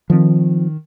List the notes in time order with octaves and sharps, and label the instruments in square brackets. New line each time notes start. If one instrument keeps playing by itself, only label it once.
[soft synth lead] D#3 [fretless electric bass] F3 C4